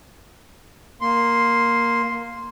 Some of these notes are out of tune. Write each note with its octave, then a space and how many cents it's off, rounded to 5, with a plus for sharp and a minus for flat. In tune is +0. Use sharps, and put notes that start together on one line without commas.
A#3 +0 C6 +0